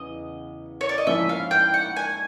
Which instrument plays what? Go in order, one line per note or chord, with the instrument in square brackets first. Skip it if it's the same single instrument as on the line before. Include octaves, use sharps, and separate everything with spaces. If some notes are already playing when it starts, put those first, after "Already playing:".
Already playing: [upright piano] E2 C#3 [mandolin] D#5
[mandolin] C#5
D5
D#5
[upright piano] G#2 F3 A#3 C#4 E4 [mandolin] E5
[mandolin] F5
G5
F#5
G#5